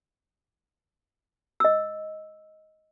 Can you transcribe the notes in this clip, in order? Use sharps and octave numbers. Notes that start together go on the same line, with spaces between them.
D#5 E6